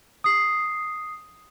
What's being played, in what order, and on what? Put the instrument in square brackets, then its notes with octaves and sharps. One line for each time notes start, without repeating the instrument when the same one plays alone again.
[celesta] D#6 C7